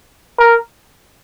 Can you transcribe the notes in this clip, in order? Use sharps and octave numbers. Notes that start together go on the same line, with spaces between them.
A#4